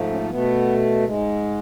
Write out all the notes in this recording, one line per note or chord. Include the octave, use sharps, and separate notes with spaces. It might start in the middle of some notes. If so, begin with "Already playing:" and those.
Already playing: G#2 F3 A3
C#4
B2 A3 B3
G#2 G#3